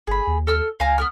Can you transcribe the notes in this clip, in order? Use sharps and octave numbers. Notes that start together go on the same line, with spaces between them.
G1 G#4 B5
D#2
A4 E6 F6
C#2 F5 G#5 A#5
B3 A#4 F6